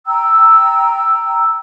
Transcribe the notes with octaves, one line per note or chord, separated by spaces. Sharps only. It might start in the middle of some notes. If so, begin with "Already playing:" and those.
G5 A#5 E6